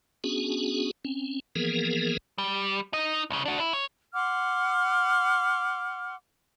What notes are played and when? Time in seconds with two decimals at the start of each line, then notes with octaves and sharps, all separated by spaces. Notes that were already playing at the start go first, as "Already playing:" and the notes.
0.24 B3 C#4 D4 F#4 G#4
1.05 C4 C#4
1.56 E3 F3 A#3 B3 G#4 A#4
2.38 G3
2.93 D#4 D#5
3.30 C2 C#3
3.45 D4 F#4
3.60 E4
3.73 C#5
4.14 F#5 C6 D6 F6